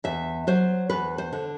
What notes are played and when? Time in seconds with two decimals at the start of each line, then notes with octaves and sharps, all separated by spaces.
0.04 E2 E5
0.47 F#3 C5
0.90 E2 B4
1.18 C5
1.33 D3